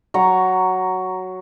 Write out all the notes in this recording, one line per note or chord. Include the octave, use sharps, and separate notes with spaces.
F#3 A#5 C#6